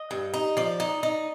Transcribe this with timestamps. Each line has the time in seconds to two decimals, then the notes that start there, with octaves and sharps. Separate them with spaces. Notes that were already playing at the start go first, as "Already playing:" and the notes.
Already playing: D#5
0.11 G2
0.34 D#4
0.57 F3 D5
0.80 D#4
1.03 D#4